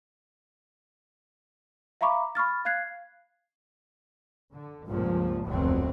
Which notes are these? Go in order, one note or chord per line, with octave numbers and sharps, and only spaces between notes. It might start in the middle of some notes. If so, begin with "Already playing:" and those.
E5 F5 A#5 B5 C#6 D6
B5 C#6 F6 A6
F5 F#6 G#6 C7
D3
C#2 G2 A#2 F3
F1 D2 G2 B2 F#3 C4